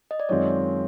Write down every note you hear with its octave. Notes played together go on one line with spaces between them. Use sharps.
D#5
D5
F#2 D#3 G#3 C4 F4 C#5